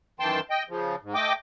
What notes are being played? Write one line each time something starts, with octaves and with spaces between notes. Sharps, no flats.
F#2 D#3 E3 G5 A5 C6
D#5 G5
C#3 F3
G#2
A3 D#5 G5 D6